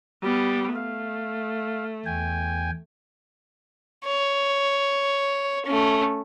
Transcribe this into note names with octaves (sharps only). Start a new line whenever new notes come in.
G3 B3
A3 F5
E2 G5 G#5
C#5
A3 C#4